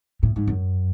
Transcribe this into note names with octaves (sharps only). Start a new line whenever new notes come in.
A2
G#2
F#2